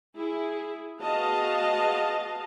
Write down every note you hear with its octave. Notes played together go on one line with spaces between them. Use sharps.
E4 G#4
B3 F#4 G#4 D#5 F5 A5